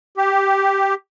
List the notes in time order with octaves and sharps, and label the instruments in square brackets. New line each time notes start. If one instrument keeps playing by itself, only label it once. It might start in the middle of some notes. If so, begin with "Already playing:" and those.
[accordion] G4